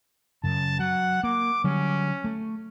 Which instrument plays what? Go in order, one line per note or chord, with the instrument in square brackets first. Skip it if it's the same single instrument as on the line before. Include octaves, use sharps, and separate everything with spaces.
[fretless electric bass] F#2 C#3 [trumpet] A5
[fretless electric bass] F#3 [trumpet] F#5
[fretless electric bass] A#3 [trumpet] D6
[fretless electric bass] D3 F#3 G3 [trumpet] C#4
[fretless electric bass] A3